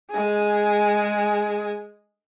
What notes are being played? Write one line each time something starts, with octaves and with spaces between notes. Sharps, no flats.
G#3 G#4